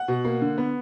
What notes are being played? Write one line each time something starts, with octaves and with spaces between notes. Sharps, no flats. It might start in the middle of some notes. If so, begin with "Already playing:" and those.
Already playing: F#5
B2
A#3
D3
B3